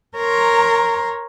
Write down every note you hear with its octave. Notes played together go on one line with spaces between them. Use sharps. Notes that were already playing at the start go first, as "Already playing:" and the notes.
A#4 C#5 A#5 C6